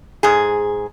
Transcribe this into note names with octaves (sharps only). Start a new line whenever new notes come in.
G#2 G#4